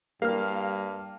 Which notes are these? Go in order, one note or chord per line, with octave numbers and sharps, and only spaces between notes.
G2 G3 A#3 F5 F6